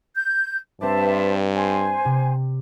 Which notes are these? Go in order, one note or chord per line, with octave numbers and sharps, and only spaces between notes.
G6
G2 C4 B4 C5 D5 E5 A5
C5 G#5
C3